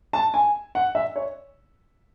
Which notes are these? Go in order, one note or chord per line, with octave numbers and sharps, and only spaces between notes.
A5
G#5
F#5
E5
C#5